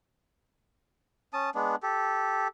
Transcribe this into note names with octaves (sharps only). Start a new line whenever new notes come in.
C#4 A5 D#6
G#3 B3 D4
G4 A4